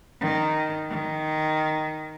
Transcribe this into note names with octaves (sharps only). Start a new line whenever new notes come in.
D#3
D#3